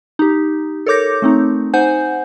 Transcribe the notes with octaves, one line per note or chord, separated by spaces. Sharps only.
D#4 G4
A4 A#4 C#5 D6 G6 A#6
A3 C4 D#4
D#4 C5 F#5 G#5 G6